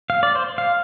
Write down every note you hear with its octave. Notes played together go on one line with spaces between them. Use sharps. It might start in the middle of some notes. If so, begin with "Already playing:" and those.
F5
D5
C5
F5